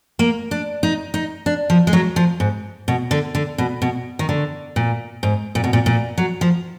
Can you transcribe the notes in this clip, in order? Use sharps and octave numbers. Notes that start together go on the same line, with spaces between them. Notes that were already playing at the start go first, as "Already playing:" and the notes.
A#3
D4
D#4
D#4
D4
F3
G#3
F#3
F3
G#2
B2
D3
D3
B2
B2
D#3
D3
A#2
G#2
A#2
B2
A#2
A#2
F#3
F3